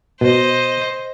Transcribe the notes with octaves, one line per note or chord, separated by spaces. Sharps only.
B2 C5 D#5